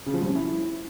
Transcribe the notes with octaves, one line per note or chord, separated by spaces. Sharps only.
C#3
F3
G3
C#4
E4